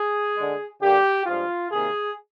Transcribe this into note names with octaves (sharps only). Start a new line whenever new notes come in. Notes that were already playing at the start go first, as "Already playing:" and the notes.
Already playing: G#4
D3 G#3
D3 G3 A#3 G4
G2 F3 G#3 F4
C3 D#3 A#3 G#4